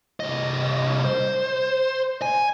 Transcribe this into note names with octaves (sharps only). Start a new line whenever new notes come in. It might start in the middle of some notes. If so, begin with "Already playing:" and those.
C2 D#5
C5
G#5